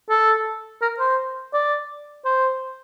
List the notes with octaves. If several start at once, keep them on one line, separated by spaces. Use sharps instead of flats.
A4
A#4
C5
D5
C5